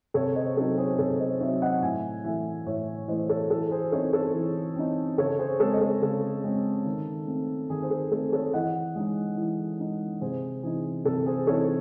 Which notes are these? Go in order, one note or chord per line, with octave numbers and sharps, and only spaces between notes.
C3 A4 C#5
C5 D#5
F#3 C4 D#4 A4
G#4 C5
C3 A4 C#5
C5 D#5
F#3 C4 D#4 C#5 E5
D#5 F#5
A2 E5 G#5
E3 A3 E5 G#5
A2 C#5 E5
E3 A3 C5 D#5
A4 C#5
E3 A4
G#4 C5
C4 D#4 A4 C#5
A4 C#5
E3
C4 D#4
C#3 A4 C#5
G#4 C5
G#3 C4 A4 C#5
D#5
A4 C#5
C#3 A4
G#3 C4
D#3
A3 C4
D#3 G#4
C5
A4
A3 C4 A4
A4 C#5
E3 D#5 F#5
G#3 D#4
E3
G#3 D#4
C3 G#4 C5
E3 C4 D#4 G#4
C3 A4
G#4 C5
E3 C4 D#4 A4 C#5